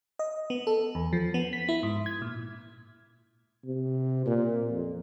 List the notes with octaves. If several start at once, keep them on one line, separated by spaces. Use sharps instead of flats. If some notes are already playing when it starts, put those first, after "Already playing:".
D#5
B3
A4
E2
F3
B3
B6
E4
G#2
G#6
A#2
C3
A#2
F2